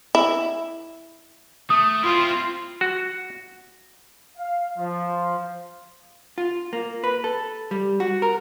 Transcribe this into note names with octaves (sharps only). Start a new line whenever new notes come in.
E4
A3 D#6
C4 E4 F4
F#4
F5
F3
F4
A#3
B4
A4
G3
F#4
A#4